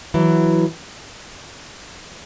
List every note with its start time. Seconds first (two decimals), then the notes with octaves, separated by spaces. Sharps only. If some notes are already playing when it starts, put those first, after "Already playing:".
0.14 E3 F#3